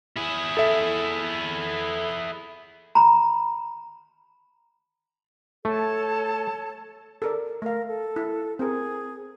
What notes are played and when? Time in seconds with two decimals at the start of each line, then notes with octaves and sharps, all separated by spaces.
0.16 E4 G#4
0.57 A4 E5
2.95 A#5 B5
5.65 A3 A4 C#5 A5
7.22 A4 A#4 D5
7.62 A3 A#4 F5
7.88 A4
8.16 E4
8.59 C4 G#4 A#4